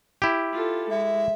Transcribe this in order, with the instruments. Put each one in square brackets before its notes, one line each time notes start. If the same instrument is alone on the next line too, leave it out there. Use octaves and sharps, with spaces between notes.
[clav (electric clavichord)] E4 G4
[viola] F4 A4
[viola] G#3 [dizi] E5